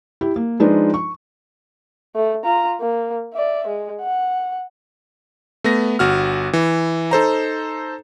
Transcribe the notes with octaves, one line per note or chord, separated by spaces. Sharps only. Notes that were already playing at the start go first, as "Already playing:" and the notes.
E4 G4
A#3
F3 G#3 D4 D#4 F4 B4
C#6
A3
F4 A#5
A#3
D5 E5
G#3
F#5
A3 B3 A#6
G1 F#4 F6
E3
D#4 A4 C5 A#5